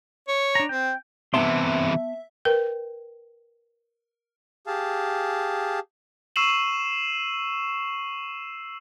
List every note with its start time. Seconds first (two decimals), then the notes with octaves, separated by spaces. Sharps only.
0.28 C#5
0.55 D4 A#5
0.69 C4 G5
1.34 C3 E3 B3 E5 A5 C6
2.45 A#4 B4 G5
4.67 G4 G#4 F5 A5
6.36 C#6 E6 C7 D#7 E7 F#7